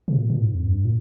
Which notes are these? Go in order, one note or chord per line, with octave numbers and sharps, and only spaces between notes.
C3
A#2
A#2
G#2
F2
G2
A#2